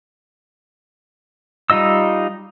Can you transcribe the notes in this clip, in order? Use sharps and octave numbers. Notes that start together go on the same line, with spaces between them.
G3 D#4 F4 D#5 E6